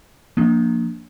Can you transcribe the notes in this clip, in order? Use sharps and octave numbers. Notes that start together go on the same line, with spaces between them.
F3 A#3 D4